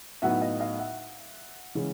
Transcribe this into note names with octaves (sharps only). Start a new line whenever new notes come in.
A2 F#3 B3 D#4 E5 F#5
D#5 F5
D#5 F5
E5 F#5
C#3 E3 G#3 C#4